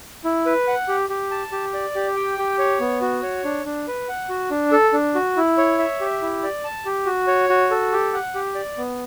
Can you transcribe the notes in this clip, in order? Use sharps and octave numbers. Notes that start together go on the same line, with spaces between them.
E4
B4
F#5
G4
G4
A5
G4
D5
G4
G5
G4
C#5
B3
F#4
C#5
D4
D4
B4
F#5
F#4
D4
A4
D4
F#4
E4
C#5
E5
G4
E4
D5
A5
G4
F#4
C#5
F#4
A4
G4
F#5
G4
D5
B3